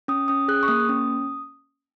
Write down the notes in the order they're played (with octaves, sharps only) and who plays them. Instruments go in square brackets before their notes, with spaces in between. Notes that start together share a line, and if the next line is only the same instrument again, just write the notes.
[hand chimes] C#4 D#6
C#4 D#6
G#4 F#6
C#6
A#3 D#6
C#4